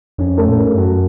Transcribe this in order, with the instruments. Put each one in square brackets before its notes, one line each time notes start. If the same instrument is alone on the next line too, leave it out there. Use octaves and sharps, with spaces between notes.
[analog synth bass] F2 [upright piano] C#4
[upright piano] A3
[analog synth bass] A#2
A2
[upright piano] A#4
[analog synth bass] G#2
G2
[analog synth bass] F#2 [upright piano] F#4